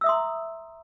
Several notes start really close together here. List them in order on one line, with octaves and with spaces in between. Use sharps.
E6 E5 D#6 C6 A#5